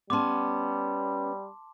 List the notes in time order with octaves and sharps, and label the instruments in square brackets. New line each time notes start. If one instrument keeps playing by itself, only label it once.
[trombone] G3 [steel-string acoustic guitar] B3 C#4 [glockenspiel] A5 C6 D6